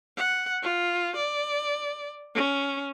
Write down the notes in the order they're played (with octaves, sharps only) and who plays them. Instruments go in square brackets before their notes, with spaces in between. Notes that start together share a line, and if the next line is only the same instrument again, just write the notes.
[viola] F#5
F4
D5
C#4